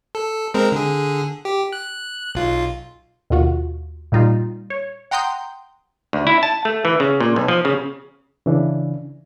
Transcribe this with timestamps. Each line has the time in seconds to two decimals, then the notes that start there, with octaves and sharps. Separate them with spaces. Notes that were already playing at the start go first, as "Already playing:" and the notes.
0.15 A4
0.54 G#3 C4 A#4
0.72 D3 G#4
1.45 G4
1.73 F#6
2.35 B1 F4
3.30 D#2 B2 F4 F#4
4.12 A#2 G3 D#4 F4
4.70 C#5
5.11 F#5 G5 A#5 C6 D#6 G6
6.13 D2
6.27 E4
6.43 A5
6.65 A3
6.85 E3
7.00 C#3
7.20 A#2
7.36 B1
7.48 F3
7.65 C#3
8.46 C#3 E3 D4